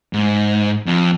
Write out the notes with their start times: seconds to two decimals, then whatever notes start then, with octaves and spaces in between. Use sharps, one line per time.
0.13 G#2
0.86 F2